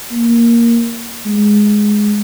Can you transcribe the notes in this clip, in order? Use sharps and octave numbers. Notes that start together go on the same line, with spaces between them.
A#3
G#3